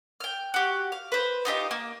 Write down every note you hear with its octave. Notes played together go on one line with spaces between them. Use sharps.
G5 F6
F#4 G4
F5
B4 C5
D#4 F4 G4 D#5
A#3